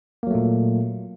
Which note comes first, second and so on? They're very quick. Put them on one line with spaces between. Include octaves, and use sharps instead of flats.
A#3 F#3 A3 A#2